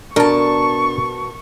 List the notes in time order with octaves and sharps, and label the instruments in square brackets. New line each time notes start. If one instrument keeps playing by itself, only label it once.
[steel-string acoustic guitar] B2 A5 [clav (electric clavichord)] D4 [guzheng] A#4 [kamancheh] C#6